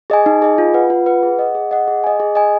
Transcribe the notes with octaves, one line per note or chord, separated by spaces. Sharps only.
G#4 D#5 G#5
D#4
G#4 D#5 G#5
F4
B4 F#5
F4
B4 F#5
G#4
D#5 F#5
G#4
D#5 F#5
G#4
D#5 G#5
G#4
D#5 G#5